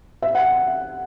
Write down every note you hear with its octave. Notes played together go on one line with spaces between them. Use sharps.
E5
F#5